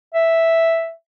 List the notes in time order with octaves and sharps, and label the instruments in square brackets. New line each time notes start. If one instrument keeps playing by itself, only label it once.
[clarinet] E5